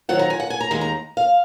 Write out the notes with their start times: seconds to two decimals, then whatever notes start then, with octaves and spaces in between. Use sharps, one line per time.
0.09 D#3 F#3 C4 F4 F#5
0.19 A#5
0.30 G#5
0.40 F#5
0.50 G#5
0.61 A#5
0.71 D#2 D#3 G#3 G#5
0.81 A#5
1.17 F5